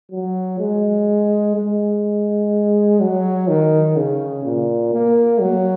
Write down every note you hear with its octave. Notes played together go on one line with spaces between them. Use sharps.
F#3
G#3
G#3
F#3
D#3
C#3
A#2
A#3
F#3